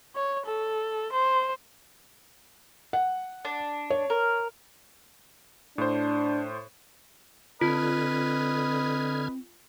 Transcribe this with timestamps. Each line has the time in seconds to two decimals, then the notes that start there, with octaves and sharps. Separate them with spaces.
0.16 C#5
0.46 A4
1.13 C5
2.93 F#5
3.45 D4
3.90 C#5
4.10 A#4
5.78 A2 D4 C5
7.61 D3 C4 F4 B4 D#5 F6 G#6